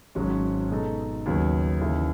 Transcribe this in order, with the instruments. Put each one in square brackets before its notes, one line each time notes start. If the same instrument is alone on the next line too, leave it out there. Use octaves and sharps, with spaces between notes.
[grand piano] G#1 G#2 F#3 C#4
B2 G#3 D#4 A4
D#2 C#3 F#3 B3
D#2 C#3 E3